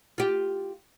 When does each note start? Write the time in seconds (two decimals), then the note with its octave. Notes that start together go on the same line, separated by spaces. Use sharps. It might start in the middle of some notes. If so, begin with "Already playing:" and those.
0.18 F4 G4